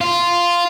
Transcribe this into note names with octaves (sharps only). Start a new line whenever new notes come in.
F4